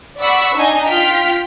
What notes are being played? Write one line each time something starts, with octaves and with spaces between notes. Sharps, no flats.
D5 F#5 B5 C#6 E6 B6
D4 D#4 D#5 G#5
F4 G5 F6 B6